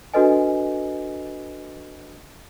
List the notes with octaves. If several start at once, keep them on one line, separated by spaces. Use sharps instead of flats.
D4 F#4 A4 B4 D#5 G#5